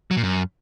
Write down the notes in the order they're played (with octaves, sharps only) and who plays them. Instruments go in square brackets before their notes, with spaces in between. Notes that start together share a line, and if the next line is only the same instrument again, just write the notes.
[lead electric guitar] F#3
A#2
F#2